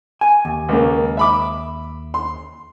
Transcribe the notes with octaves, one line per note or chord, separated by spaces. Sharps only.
G#5
D#2
C#2 A#3
E5 B5 D6
C6